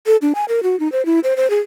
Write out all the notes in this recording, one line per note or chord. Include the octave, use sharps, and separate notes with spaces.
A4
D4
G#5
A#4
F#4
D#4
C5
E4
C5
C5
G#4